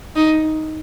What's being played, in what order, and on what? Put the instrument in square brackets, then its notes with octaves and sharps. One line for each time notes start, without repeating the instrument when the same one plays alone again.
[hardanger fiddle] D#4